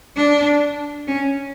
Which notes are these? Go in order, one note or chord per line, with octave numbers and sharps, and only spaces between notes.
D4
C#4